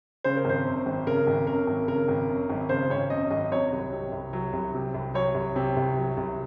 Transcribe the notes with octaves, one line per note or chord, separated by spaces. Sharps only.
C#3 C5
A#4
G#1 C5
F#2
G#1
C#3 A#4
G#1
F#2 A#4
G#1
C#3 A#4
G#1
F#2
G#1
C#3 C5
G#1 C#5
F#2 D#5
G#1 D#5
F#3 C#5
C2
C3
C2
F#3
C2
C3
C2
F#3 C#5
C2
C3
C2
F#3
C2